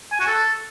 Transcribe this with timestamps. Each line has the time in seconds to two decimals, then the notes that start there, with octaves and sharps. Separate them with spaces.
0.12 G#5
0.20 F#4
0.27 A4